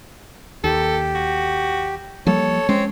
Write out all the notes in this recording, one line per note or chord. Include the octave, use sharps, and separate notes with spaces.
D#2 G4 A4
F#4
F3 G3 A#3 A4 C#5
G#3 C4 C#4